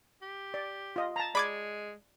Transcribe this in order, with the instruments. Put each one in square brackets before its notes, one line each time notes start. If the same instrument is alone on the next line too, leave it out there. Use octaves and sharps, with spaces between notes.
[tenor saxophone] G4
[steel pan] D5
F4 D#5
A5 A#5
[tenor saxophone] G#3 [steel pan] D5 [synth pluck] B5 D6 G#6